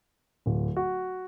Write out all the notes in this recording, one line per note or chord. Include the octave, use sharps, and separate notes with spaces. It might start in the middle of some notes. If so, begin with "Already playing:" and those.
D1
F#4